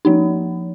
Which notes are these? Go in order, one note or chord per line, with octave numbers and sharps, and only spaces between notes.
F3 A#3 D#4